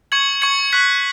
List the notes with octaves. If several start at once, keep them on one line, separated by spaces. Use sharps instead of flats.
C#6 G#6 C#7 F#7
C#6 G#6 C#7 F#7
C#6 F#6 B6 F#7